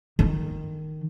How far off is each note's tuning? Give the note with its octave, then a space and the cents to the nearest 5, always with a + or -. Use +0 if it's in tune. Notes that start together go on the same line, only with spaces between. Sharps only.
D#3 -5